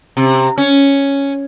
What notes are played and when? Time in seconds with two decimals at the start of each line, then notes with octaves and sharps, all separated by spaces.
0.17 C3
0.58 C#4